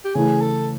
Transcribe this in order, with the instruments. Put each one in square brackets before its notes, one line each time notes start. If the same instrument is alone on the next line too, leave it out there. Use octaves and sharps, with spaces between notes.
[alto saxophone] G4
[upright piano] C#3 E3 A3 [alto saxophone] G#4
[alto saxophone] A4